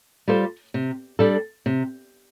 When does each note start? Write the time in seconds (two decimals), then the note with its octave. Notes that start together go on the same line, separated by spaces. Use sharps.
0.28 G3 F4 A4 C5
0.74 C3
1.19 G3 D4 A4
1.66 C3